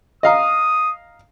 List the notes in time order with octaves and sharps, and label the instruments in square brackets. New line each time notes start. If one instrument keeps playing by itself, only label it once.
[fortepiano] D#5 F5 A#5 [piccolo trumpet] D#6